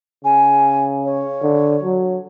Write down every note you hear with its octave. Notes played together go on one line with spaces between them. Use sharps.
C#3 G#5
C#5
D3
F#3